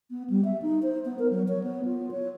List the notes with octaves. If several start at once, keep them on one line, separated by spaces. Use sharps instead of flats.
B3
G3
E5
D#4
C5
B3
A#4
F#3
C#5
B3
F4
C#5